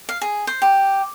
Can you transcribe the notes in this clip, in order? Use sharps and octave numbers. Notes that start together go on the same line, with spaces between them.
F5
G#4
C5
G4